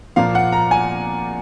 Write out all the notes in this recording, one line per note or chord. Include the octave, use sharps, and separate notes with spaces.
A#2 F3 A#3 F5
F#5
A#5
G#5